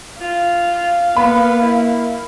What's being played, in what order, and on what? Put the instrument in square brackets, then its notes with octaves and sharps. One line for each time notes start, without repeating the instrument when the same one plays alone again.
[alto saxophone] F4 [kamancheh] F5
[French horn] A#3 [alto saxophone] B3 [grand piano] B5
[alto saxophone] E4